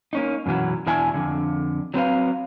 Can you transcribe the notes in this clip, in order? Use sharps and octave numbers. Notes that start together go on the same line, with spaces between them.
A#3 C#4 D#4
F#2 B2 E3 F#3
E2 B2 D4 E4 E5 G#5
F2 G#2 D3
F#3 C4 B4 F5